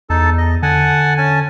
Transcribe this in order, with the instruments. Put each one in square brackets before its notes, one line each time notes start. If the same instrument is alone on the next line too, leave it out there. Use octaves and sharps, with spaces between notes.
[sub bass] E2 [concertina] D#4 A4 A5
[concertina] D#5
[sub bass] D3 [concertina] F#5 G#5 A5
[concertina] C#4 G#5 A5